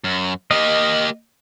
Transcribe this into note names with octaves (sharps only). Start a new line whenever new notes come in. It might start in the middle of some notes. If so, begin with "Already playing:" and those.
F#2
A#3 G4 D#5